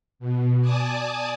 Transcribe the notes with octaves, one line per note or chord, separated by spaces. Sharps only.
B2
D5 G#5 A5 D6 D#6